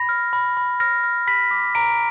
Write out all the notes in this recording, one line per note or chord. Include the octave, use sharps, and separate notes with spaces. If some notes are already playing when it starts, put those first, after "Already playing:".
Already playing: B5 A#6
F6
B5
B5
F6 A#6
F6
B5 B6
D6
A#5 D7